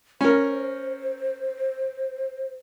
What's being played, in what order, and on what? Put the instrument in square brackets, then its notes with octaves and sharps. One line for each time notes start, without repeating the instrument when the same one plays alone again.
[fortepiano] C#4 A#4 [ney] C5